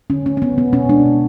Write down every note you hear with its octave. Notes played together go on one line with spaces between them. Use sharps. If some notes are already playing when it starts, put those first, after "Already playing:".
D3 C#4
A3 C#4
C#4
C#3 B3
B2 B3
B2 C#4
G#3 D4
B2